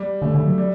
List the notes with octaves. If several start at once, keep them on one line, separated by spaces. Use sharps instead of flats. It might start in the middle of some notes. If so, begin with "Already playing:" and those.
Already playing: G3
D3 A3
D3
F#3
G3